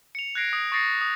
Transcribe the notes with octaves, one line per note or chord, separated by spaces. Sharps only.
C#7 F7
F#6 G#6 A#6 C7 D7
D#6
C#6 D#6 A6 A#6 C7 C#7
D#6